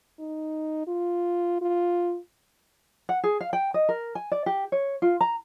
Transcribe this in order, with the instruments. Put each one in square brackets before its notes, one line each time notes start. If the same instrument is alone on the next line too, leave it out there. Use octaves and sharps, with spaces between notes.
[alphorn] D#4
F4
F4
[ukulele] F#5
G#4
F5
G5
D#5
A#4
G#5
D5
G4
C#5
F4
A#5